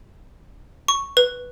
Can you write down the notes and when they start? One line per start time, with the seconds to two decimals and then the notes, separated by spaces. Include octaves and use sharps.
0.88 C#6
1.17 B4